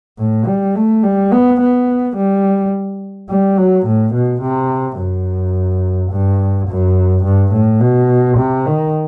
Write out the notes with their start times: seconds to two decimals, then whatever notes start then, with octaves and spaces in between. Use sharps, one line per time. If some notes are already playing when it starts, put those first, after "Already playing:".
0.19 A2
0.47 G3
0.76 A3
1.04 G3
1.32 B3
1.61 B3
2.17 G3
3.29 G3
3.58 F#3
3.87 A2
4.14 B2
4.42 C3
4.98 F#2
6.11 G2
6.68 F#2
7.24 G2
7.53 A2
7.80 B2
8.37 C3
8.66 D#3